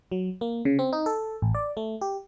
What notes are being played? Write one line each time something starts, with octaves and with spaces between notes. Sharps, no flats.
F#3
A#3
C#3
C4
D#4
A4
A1
D5
A3
G4